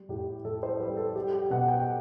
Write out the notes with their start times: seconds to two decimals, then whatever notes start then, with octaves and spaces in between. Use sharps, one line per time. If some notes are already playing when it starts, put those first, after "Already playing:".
Already playing: G3
0.09 A2 G4
0.44 A2 A4
0.63 C5
0.80 G3 B4
0.97 A4
1.15 G3 G4
1.33 G4
1.50 B2 F#5
1.68 G5